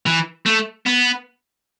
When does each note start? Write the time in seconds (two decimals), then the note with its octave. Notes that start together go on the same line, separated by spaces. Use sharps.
0.06 E3
0.46 A3
0.86 B3